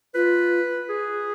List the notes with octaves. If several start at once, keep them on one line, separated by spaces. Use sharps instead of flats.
F4 B4
G#4